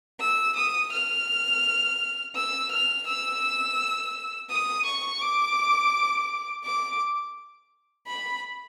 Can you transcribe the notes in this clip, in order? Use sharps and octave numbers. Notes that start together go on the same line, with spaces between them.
E6
D#6
F6
E6
F6
E6
D#6
C#6
D6
D6
B5